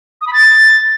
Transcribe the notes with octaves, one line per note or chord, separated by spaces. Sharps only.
D#6
B5
A6